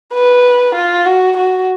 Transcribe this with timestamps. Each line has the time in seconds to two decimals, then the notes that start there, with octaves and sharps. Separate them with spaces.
0.13 B4
0.75 F4
1.06 F#4
1.37 F#4